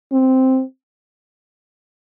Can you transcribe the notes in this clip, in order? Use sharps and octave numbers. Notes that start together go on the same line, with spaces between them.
C4